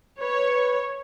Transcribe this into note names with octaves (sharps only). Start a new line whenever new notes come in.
B4 C#5